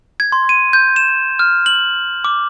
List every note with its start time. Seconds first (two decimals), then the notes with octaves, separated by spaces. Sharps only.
0.20 G#6
0.32 C6
0.49 D#7
0.73 G6
0.96 E7
1.39 F6
1.66 F#7
2.24 D6